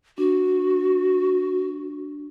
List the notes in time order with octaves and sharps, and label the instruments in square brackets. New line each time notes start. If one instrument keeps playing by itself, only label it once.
[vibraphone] D4 [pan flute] F#4